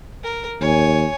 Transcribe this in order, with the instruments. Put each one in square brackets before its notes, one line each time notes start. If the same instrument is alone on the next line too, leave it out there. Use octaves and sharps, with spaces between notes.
[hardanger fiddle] A#4
[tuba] D#2 [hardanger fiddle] C#5 G#5